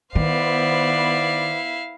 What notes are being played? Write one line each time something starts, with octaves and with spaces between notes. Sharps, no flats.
D#3 B3 E4 B4 C5 D5 F5